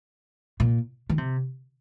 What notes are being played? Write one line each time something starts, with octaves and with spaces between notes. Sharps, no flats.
A#2
D#3
C3